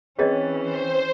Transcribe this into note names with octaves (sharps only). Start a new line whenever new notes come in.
E3 C4 C#4 G#4 B4 C#5 D#5 A6
C5